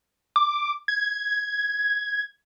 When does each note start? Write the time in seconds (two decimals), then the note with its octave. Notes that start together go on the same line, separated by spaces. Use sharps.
0.36 D6
0.88 G#6